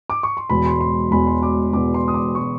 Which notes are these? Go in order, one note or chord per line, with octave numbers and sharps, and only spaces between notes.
D6
C#6
C6
E1 E2 B2 G#3 B5
C6
C6
E1 E2 B2 G#3 B5
C6
D6
E1 E2 B2 G#3 D6
C6
D#6
D6
B2 G#3 C#6